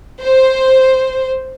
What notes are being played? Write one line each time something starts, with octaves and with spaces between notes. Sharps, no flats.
C5